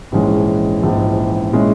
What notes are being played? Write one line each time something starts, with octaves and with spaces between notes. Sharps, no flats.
A#1 G#2 E3 G#3 C#4
A#1 G#2 E3 G#3 C#4
A#2 G#3 C#4 E4